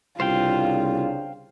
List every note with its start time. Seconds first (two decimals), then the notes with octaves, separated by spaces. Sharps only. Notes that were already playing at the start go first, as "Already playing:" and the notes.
0.20 C2 C#3 D4 F4 C5 F5 G5